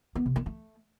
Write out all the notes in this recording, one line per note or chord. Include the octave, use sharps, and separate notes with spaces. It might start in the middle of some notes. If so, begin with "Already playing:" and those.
B3
C3
A#3
A3